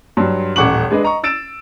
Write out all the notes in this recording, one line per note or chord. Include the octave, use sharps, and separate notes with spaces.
G2 F#3 C6
D#1 A1 F#5 C#6 D6 F#7
G#3 D4 B4 D#5
D#5 A#5 C#6
E6 A6 D7 E7